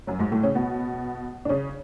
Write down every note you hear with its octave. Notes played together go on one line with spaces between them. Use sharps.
F#2 F#3
G#2 G#3
A2 A3
C#3 C#4
B2 B3
D4
C#3 C#4